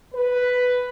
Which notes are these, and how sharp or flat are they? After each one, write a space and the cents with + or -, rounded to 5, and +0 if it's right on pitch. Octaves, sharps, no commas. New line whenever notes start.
B4 +5